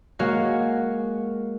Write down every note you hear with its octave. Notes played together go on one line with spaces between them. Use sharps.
G#3 A#3 F#4 A#4 C#5 F5